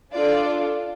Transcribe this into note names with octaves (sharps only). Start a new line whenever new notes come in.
D4 F4 A4 D5